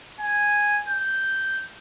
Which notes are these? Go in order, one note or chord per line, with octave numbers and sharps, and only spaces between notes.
G#5
G6